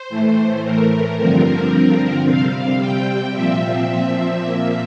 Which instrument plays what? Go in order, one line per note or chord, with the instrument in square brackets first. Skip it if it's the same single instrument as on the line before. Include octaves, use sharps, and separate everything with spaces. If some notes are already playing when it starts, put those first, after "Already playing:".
Already playing: [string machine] C5
A2 E3 A3
A#4
G2 D3 F3 C4 A#4
C3 G3 C4 F5
G5
A#2 F3 C4 E5
A#2 F3 A#3